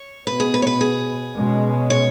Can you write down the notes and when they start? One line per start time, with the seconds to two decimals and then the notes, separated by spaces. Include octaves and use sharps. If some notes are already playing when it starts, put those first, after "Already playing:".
Already playing: C#5
0.26 B2 B3 B4
0.40 G#4
0.54 B4
0.62 C#5
0.67 B4
0.81 G#4
1.35 B2 G#3 C#4
1.90 C#5